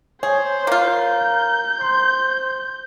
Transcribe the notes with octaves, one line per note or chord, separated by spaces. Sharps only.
G#4 C5 C#5
A#3 F4 A#4
G6
C5 C6